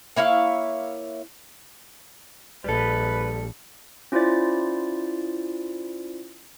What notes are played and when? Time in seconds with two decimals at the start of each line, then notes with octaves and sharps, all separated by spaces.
0.16 A#3 E4 C#5 F5
2.64 A#1 G3 A4 B4
4.12 C#4 E4 F4 C5 D5 A6